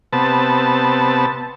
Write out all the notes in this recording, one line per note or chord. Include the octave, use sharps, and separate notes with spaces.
C3 B3 A5